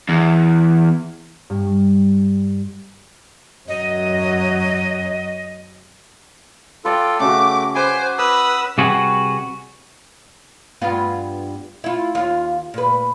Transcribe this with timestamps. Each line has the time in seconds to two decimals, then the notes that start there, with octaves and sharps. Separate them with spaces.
0.09 E2
1.50 G2
3.68 F#2 F#3 D#5
6.85 F4 A4 B4 D5 G5
7.20 C#3 A3 F#4 D6
7.75 B4 C5 G#5 D6
8.19 B4 D#5 D#6 E6
8.78 C3 G3 F#4 G#4 B4
10.81 G2 B3 F4
11.84 E4 F4
12.15 D#2 F4
12.74 A#2 B4